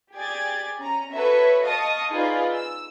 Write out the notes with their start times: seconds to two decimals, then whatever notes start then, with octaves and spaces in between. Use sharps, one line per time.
0.15 G4 G#4 D5 G#6 A6
0.79 C#4 A#5
1.13 F#4 A4 B4 C#5 E5
1.64 D#5 F5 A5 C#6 D#6
2.12 D#4 F4 G#4 B4 D5 F5
2.53 E6